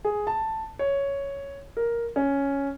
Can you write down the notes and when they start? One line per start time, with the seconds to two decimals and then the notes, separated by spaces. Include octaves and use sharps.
0.05 G#4
0.27 A5
0.79 C#5
1.77 A#4
2.16 C#4